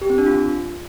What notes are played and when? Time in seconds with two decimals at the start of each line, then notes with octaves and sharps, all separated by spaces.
0.01 G4
0.10 C4
0.18 D4
0.26 F4